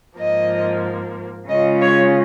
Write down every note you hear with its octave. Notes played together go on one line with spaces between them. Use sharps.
G#2 F3 A#3 D#5
C#3 G#3 C#4 F4 D#5
C#5